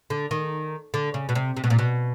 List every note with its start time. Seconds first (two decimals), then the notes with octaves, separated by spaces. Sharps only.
0.10 D3
0.31 D#3
0.94 D3
1.14 C#3
1.29 B2
1.35 C3
1.57 C3
1.64 B2
1.70 A#2
1.79 B2